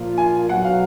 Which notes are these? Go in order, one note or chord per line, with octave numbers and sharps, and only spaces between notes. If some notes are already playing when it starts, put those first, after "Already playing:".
Already playing: A#2 F3 A#3 F4
G#5
B1 B2 F#3 F#5
F5